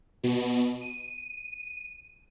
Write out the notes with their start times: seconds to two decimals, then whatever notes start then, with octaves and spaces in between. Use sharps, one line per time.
0.24 B2
0.81 D#7